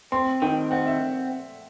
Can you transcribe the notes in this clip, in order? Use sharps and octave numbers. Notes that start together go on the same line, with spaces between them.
C4 C6
D#3 G5
C4 F#5
E5